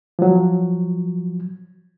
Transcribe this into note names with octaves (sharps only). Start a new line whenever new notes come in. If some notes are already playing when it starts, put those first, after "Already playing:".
F3 F#3